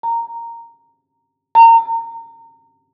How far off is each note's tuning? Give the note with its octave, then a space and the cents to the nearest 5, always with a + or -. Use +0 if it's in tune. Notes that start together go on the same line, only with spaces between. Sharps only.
A#5 -10
A#5 -25